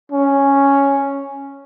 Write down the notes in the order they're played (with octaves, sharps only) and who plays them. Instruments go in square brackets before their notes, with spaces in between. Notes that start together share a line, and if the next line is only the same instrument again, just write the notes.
[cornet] C#4